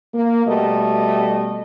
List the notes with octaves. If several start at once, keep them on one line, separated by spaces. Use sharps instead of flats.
A#3
B2 G3 A3 D#5